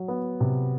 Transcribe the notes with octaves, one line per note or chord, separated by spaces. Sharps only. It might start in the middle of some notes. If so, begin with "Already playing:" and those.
Already playing: F#3
B3
C3